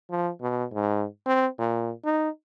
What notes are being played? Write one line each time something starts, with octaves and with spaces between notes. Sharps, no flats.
F3
B2
G#2
C4
A#2
D#4